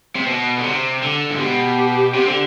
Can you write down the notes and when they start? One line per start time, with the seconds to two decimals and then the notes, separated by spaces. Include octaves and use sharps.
0.15 C3
0.27 B2
0.58 D3
0.65 C3
1.02 D3
1.31 G#2
1.39 B2 G4
2.14 C3
2.25 D3